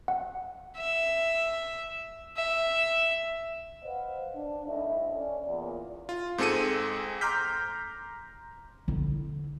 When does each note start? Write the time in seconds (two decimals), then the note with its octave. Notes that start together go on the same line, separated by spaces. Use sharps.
0.08 F#5
0.78 E5
2.37 E5
3.83 B4 C5 D#5 F5 F#5
4.34 D4
4.65 C2 A2 D#4 D#5 E5
5.13 C#4 A4 D5
5.44 E2 A#2
6.09 F4
6.38 G#2 C4 G#4 A4 C#7 D#7
7.21 A#5 C6 D6 F6 G6 B6
8.88 D3 E4